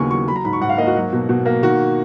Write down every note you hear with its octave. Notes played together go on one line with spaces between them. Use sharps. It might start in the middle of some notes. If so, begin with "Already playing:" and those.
Already playing: D#2 C#3 F#3 B3 A#4 G#5 C#6
F#3 C#6
F#3 B5
A#5
G#2 B5
C#6
G#2 F#5
F5
A#3 D#5
F#4
F#3
B2
B2
A#3
D#3 F#4